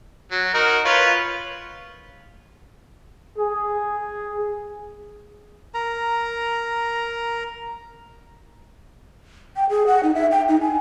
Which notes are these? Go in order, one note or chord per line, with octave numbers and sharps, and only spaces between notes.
F#3
D#4 F#4 A#4
F4 B4 C#5
G#4
A#4 A#5
G5
G#4
F#5
D#4
E5
G5
D#4
G#5